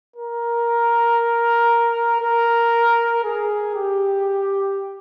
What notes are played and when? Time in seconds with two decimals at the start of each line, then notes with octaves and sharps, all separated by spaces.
0.16 A#4
2.21 A#4
3.24 G#4
3.75 G4